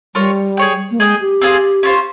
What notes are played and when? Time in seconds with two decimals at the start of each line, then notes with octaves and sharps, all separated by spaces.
0.15 G3 F4 A#4 C#5
0.57 G#4 C#5 G5
0.91 A#3
0.99 G#3 G#4 D#5 G5
1.20 G4
1.41 C4 F4 G#4
1.83 C#4 F4 C5